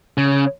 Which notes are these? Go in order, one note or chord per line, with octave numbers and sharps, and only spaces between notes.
C#3